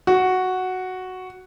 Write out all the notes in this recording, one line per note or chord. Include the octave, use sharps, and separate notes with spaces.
F#4